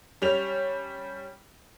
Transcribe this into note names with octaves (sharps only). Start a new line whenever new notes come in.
G3 C#4 F7